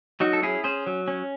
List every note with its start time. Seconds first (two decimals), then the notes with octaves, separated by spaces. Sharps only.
0.20 F#3 D#4 F#4
0.33 A4
0.42 C#4 E4 G#4
0.64 C#4 G#4 C5
0.87 F#3
1.08 C#4